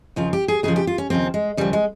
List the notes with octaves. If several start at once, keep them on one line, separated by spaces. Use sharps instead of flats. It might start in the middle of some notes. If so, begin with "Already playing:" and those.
D#2 C#3 F3 F4
G4
G#4
D#2 C#3 F3 G#4
G4
F4
C#4
D#2 C#3 F3 C4
G#3
D#2 C#3 F3 G3
G#3